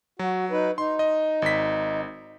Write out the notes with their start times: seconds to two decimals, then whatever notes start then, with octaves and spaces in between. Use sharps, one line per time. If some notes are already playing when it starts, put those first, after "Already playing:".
0.19 F#3 F#4
0.51 D#4 B4
0.78 D#4 C6
0.99 D#5
1.42 G#1 B6